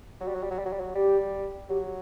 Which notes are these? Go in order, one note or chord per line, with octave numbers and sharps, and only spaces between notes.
F#3 F#4
G3
F#3
G3
F#3
G3
F#3
G3
F#3
G3 G4
F#3 G4